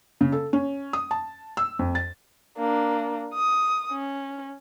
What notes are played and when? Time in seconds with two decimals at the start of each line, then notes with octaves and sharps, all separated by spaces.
0.21 C#3
0.32 A4
0.53 C#4
0.93 D#6
1.11 A5
1.57 E6
1.79 F2
1.95 A6
2.57 A#3 D4
3.34 D#6
3.92 C#4